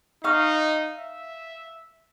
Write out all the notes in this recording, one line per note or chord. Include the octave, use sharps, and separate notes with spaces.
D#4 F5 C#6 F6
E5